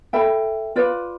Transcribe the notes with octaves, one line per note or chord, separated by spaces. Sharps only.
A4 E5 G5 B5
F4 B4 D5